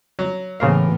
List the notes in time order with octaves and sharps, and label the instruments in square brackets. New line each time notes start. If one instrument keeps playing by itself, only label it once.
[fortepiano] F#3
[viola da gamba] A2 B3 [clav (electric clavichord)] C#3 C5 F5 [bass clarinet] E3 [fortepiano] A#3 A#4